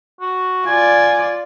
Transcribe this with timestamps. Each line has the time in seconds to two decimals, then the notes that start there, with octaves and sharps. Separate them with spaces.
0.21 F#4
0.66 F4 D5 G#5